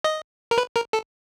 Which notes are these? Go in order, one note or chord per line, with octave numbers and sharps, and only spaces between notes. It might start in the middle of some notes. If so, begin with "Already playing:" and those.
D#5
A#4
B4
A#4
A4